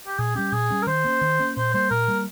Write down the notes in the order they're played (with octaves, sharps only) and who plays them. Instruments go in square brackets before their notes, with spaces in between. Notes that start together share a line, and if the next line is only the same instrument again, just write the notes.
[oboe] G4
[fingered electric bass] A#2 [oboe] G#4
[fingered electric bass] G3 C#4 [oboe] G4
[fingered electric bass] A#2 [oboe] G#4
[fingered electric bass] G3 C#4
[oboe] A#4
[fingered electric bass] D#3 [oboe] C5
[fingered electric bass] A#3 C#4
D#3
A#3 C#4
[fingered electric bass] A#2 [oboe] C5
[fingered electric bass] G3 A#3 [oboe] C5
[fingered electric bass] A#2 [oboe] A#4
[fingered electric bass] G3 A#3